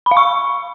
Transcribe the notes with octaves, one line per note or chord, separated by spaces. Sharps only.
B5
F5
C#6